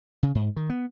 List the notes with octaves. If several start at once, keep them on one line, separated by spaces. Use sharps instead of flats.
C#3
G#2
D#3
B3